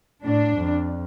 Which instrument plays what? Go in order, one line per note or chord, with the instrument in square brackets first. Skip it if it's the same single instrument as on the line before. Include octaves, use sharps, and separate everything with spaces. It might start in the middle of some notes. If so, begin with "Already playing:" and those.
[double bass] A2 [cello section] D4
[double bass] F2